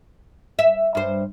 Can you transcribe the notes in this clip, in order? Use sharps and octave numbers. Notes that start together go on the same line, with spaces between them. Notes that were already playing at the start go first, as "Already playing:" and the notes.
E5
G2 C5